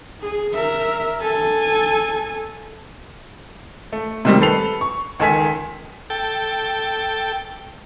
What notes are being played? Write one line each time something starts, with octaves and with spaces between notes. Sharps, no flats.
G#4
A#4 E5
A4 G#5
A3
C3 D#3 G3
A4 B4 C7 F7
C#6
C#2 D#3 A4 G#5 B6
A4 G5